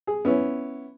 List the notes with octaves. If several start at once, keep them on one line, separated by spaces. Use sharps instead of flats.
G#4
B3 C#4 E4